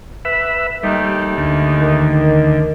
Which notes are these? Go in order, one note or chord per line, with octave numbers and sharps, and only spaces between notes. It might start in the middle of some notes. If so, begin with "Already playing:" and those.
B4 E5
D#2 G3 A3 D#4
D2
D#3